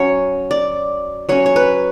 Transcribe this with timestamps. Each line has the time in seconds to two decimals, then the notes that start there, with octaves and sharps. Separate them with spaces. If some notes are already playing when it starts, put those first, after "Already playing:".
Already playing: F#3 C#4 C#5
0.51 D5
1.29 F#3 C#4 C#5
1.46 C#5
1.56 B4